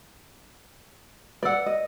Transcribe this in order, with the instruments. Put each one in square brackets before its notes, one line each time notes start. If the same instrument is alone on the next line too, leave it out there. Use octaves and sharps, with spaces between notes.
[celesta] B4 E6 [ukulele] D5 F#5
[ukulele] D#5